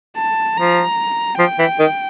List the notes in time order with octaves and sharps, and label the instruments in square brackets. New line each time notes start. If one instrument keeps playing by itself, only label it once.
[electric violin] A5
[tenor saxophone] F3 [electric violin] A#5
[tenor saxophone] F3 [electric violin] G5
[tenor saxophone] E3
D#3